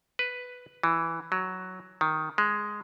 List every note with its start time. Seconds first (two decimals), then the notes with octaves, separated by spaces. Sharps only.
0.19 B4
0.83 E3
1.32 F#3
2.01 D#3
2.38 G#3